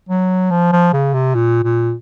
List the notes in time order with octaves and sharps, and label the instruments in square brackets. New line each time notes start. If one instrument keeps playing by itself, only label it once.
[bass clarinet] F#3
F3
F3
C#3
C3
A#2
A#2